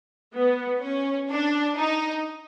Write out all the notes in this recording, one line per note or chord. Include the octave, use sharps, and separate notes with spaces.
B3
C#4
D4
D#4